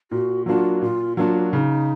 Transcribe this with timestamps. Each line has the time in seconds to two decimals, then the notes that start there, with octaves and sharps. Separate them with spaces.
0.11 A#2 F#4
0.46 F#3 A#3 D4 F4 F#4
0.82 A#2 F4
1.17 F#3 A#3 D4 F4 F#4
1.53 C#3 D#4